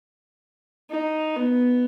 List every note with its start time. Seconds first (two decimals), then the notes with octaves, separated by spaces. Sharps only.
0.91 D#4
1.36 B3